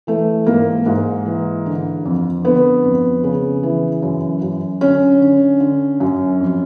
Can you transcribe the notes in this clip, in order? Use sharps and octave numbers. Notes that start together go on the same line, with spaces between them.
E3 A3
G#2 A#3
G#2
E3
D3
F2
D3 B3
F2
C#3
E3
F#2
F#2
D3 C#4
D3
D3
F#2
F2